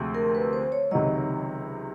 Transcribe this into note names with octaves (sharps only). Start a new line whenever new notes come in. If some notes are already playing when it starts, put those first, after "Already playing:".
Already playing: D2 C3 F3 G#3 C4
A#4
B4
C5
C#5
C#2 C3 D#3 F#3 D#5